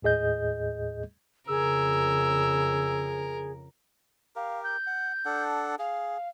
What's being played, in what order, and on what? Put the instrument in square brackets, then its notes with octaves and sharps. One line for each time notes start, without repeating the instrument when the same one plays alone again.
[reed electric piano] D#2 A2 G#4 D#5 G6
[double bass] F2 C#3 [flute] G#4 [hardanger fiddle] A#4 [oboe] E6
[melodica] G4 A#4 [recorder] F5
[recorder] G6
[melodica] F#5
D4 A4 F#5
[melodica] G#4 [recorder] F5